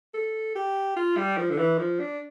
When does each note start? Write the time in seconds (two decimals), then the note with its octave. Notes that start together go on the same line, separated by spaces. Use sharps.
0.14 A4
0.55 G4
0.96 F4
1.17 G3
1.38 F3
1.50 D3
1.58 E3
1.79 F3
1.99 D4